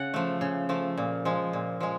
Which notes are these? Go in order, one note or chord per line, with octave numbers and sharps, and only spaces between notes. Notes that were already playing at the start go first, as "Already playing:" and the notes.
Already playing: C#3 F#5
F3 A3
C#3
F3 A3
A#2
F3 G#3
A#2
F3 G#3